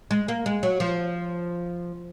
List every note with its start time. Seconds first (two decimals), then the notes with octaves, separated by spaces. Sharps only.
0.11 G#3
0.28 A#3
0.46 G#3
0.63 F#3
0.80 F3